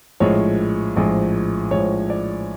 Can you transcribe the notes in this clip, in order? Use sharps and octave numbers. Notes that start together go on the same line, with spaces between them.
A#1 A2 F3 G#3 C#5
A#1 A2 F3 G#3
A#1 A2 F3 G#3 C#5
D5